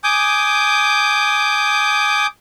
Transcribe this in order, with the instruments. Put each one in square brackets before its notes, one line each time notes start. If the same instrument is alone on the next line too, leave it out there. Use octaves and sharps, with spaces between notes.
[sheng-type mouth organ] G#5 D6 D#6 G6